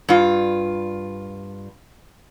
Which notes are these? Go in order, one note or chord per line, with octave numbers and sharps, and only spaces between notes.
G2 F4